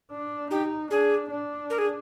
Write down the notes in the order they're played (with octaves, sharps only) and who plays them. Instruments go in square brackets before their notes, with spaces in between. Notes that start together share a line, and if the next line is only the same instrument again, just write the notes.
[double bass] D4
[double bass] D#4 [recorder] G4
[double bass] D4 [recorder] G#4
[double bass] D4
[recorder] A#4
G#4